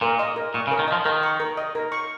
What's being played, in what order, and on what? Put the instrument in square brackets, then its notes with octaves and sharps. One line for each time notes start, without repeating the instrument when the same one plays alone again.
[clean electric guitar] A#2 [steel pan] A#4
[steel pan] D#5
A#4
[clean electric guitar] A#2 [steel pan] C#6
[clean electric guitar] C#3
[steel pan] A#4
[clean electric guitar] D#3
[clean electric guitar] F3 [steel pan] D#5
[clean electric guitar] D#3 [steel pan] A#4
[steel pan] C#6
A#4
D#5
A#4
C#6